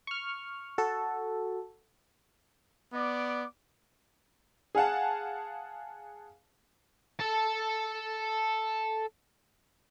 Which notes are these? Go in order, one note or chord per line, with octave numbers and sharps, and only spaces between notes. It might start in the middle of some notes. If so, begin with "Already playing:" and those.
C#6 F6
F#4 A4
B3 D5 D6
G#4 F5 F#5 A5
A4 A5